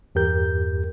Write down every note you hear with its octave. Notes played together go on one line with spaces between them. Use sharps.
E2 G2 G4 A#4 G6